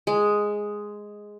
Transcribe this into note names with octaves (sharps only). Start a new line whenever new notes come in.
G#3